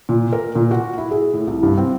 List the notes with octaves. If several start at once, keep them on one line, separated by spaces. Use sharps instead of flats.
A#2
A#4
A#2
F#4
E4
G#4
A2
C2
G2
C4